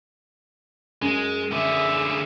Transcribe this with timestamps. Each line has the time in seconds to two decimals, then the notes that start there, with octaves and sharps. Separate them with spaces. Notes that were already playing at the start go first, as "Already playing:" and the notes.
1.02 F#2 G#3
1.52 D3 G#4 E5